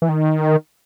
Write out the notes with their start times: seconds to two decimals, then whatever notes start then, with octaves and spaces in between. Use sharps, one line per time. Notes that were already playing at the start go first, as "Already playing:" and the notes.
0.02 E3
0.09 D#3